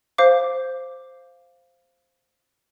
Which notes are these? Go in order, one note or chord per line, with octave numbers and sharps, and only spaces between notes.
C5 F5 D6